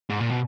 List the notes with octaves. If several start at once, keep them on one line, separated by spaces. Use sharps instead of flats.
G#2
A#2
B2